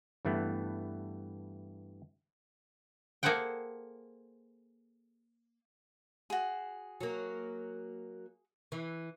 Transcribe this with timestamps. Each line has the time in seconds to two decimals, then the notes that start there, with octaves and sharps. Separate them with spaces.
0.25 G2 E3 A3 B3
3.23 A#3 G#4 A4 C5 F#5 G5
6.30 F#4 G#4
7.01 F#3 A#3
8.72 E3